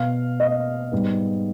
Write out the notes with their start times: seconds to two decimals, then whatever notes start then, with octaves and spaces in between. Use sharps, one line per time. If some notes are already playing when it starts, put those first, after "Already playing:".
Already playing: B2 B3 F5
0.40 D#5
0.92 G#2 G3 B3